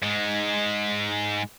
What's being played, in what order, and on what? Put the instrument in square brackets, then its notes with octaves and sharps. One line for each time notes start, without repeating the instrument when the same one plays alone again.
[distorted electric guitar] G#2 G#3